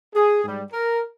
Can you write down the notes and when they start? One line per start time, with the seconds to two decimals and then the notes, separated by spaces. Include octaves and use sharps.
0.15 G#4
0.44 G#2 G3
0.72 A#4